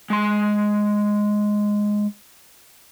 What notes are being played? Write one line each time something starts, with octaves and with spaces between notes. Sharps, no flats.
G#3 C6